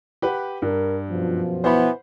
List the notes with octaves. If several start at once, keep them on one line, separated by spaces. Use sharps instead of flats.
G4 B4 F#5
G2 A#4
F#2 B2 F3
E3 B3 C5 F#5 B5